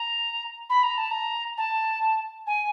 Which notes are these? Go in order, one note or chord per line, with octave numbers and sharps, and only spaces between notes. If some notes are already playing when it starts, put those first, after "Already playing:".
Already playing: A#5
B5
A#5
A5
A#5
A5
G#5